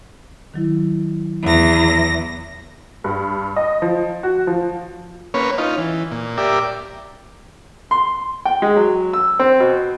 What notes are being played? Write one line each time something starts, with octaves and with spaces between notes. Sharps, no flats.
D#3 F#3 E4
E2 B3 A#6
G2
D#5
F3
F#4
F3
A#3 C#4 B4 C#5
C#4 D#4 F4
E3
A#2
G4 A#4 D5 E5
C6
G5
G#3
F#3
E6
C4
B2